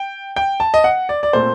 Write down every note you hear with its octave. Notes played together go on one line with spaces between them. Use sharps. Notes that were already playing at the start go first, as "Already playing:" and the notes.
Already playing: G5
G5
A5
D#5
F#5
D5
D5
A#2 A3 C4 C5